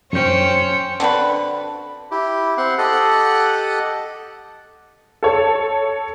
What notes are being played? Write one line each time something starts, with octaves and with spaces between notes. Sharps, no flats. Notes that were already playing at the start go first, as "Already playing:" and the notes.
F#2 C#4 C5 G5 G6 C#7
D3 C4 F#4 B4
E4 G4
C4 F#5 C6
G4 A4 D#5 F#5 F#6
A4 C#5